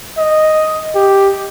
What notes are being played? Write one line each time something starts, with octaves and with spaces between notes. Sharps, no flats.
D#5
G4